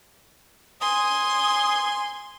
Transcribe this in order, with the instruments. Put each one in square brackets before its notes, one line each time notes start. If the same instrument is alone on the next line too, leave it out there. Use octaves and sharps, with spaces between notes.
[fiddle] G#5 C6 [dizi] D#6